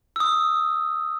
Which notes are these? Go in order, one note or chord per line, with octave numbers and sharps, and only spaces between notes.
D#6 E6